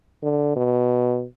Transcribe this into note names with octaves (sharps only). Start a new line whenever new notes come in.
D3
B2